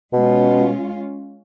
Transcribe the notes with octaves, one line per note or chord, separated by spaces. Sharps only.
B2 G#3 C#4 F4